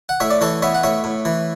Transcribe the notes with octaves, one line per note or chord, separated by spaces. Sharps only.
F#5
A2 C#5 E5
D5
E3 A4 C#5
B3 C#5 E5
F#5
A2 C#5 E5
A2
E3